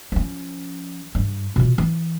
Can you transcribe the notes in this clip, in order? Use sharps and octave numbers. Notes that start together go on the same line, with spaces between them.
F3 C#4
G2
B2 F4
E3